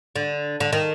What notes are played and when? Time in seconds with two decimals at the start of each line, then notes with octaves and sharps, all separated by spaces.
0.15 D3
0.60 D3
0.73 D#3